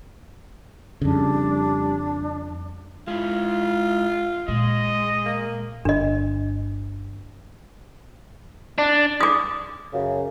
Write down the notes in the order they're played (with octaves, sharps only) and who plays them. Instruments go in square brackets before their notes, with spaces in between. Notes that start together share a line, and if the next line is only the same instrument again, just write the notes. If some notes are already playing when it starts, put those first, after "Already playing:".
[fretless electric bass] F2 C#3 [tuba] G3 [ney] D4
[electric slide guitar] G#3 E4 [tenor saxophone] F4
[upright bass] A#2 [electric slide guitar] G#3 [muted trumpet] D#5
[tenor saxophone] A#3
[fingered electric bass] G1 [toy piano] D4 D#5
[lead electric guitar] D4
[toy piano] D6 D#6
[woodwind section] F#2 C#3